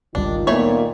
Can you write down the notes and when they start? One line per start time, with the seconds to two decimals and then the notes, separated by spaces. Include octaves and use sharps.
0.15 G1 C#2 D#3 G3 D4 D#4 F4
0.47 A#2 E3 A3 B3 C#5